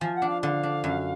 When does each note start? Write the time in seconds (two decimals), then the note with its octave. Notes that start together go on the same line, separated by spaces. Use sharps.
0.01 F3 G#5
0.15 F#5
0.22 D4
0.29 F5
0.42 D3 F5
0.63 D4
0.84 F#2